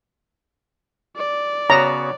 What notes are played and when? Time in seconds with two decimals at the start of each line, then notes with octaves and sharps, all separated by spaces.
1.16 D5
1.70 C#3 B3 F#4 C#5 A#5